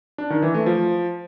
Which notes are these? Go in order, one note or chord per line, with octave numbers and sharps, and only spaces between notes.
D4
D#3
E3
A3
F3